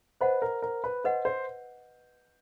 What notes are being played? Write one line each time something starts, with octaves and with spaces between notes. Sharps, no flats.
B4 C5 D#5 F#5
A#4
A#4
B4
B4 C5 D#5 F#5
C5